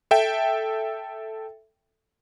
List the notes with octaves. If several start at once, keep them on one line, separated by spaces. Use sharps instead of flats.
A4 E5 G5